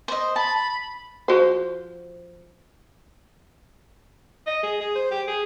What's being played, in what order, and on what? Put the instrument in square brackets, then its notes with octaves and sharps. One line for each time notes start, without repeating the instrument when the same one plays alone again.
[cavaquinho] C5 D#5
[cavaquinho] A5 [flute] B5
[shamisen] F3 F#4 C5
[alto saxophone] D#5
G#4
G#4
C5
G4
G#4